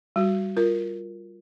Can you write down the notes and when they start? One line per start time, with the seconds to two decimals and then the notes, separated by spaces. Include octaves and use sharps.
0.16 G3 F#4
0.57 F4 A#4